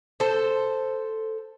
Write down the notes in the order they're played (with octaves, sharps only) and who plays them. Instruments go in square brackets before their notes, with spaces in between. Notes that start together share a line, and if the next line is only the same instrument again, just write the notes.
[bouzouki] A4 C5